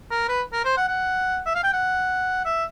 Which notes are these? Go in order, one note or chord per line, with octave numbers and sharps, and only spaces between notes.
A#4
B4
A#4
C5
F#5
F#5
E5
F5
G5
F#5
E5